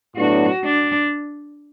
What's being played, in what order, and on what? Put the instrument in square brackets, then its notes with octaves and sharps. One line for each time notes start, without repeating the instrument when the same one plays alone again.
[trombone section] A2 F#3 B3 D4 [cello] F#4
[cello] D4